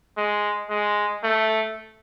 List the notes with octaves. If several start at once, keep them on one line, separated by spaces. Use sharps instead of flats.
G#3
G#3
A3